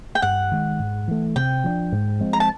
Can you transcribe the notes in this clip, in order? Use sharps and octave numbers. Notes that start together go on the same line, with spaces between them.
G5
G2 F#5
D#3 G#3
G#2
E3 A3
C3 G5
F3 A3 D4
G#2
F3 G#3 C4
A#5
A5